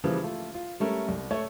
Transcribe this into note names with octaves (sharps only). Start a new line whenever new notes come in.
C#3 E3 F3 G3 A#3
A3 F4
F4
G3 A3 C#4 A#4
C2
A3 C#5